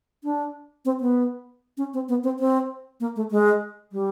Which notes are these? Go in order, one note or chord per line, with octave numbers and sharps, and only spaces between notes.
D4
C4
B3
C#4
C4
B3
C4
C4
A#3
A3
G#3
G3